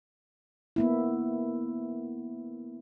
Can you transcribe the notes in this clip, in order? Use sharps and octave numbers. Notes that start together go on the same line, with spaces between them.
A#3 B3 E4